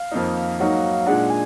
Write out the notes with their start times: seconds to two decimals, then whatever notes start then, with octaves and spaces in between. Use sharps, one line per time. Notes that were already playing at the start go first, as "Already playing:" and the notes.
Already playing: F5
0.11 F2 D#3 A#3 D#4
0.60 G#2 F#3 A#3 D#4 F#4
1.06 A#2 G#3 D4 F#5
1.30 G#5